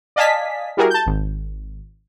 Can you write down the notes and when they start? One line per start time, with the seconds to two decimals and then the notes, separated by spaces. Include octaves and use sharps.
0.16 D5 D#5 F5 G#5 A5 B6
0.77 G3 E4 F#4 G#4 A#4
0.90 A5 G6
1.06 G#1